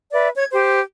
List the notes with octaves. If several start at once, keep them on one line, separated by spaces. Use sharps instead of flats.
B4 D5 E5
C#5 G#6
G4 C5